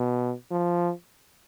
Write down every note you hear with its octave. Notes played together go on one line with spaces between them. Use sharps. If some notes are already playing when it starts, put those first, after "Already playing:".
Already playing: B2
F3